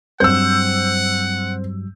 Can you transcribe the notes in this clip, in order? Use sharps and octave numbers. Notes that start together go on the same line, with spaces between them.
G2 F#3 G3 C4 F#5 E6 G6